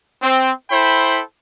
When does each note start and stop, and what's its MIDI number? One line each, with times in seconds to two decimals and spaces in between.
0.23 0.52 60
0.70 1.21 64
0.70 1.21 69
0.70 1.21 72
0.70 1.21 79
0.70 1.21 83